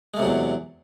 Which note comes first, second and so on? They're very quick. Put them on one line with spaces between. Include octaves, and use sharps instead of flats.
G#3 A3 C3 F#3 E2